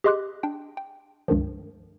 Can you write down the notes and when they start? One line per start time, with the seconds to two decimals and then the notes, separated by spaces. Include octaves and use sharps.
0.04 G4 G#4 D#5 C6 D6 F#6
0.43 D4 G5
0.77 G5
1.28 C#2 G2 D#3 F3